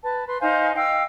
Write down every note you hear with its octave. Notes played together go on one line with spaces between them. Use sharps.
B4 A5
B4 C6
D#4 C5 F5 G#5
D#5 F5 G5 E6